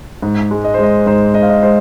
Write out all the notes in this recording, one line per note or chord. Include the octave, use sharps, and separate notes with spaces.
G#2
G#3
D#5
C5
G#3
D#5
G#2 C5
G#2 D#5
F5
D#5
G#3 C5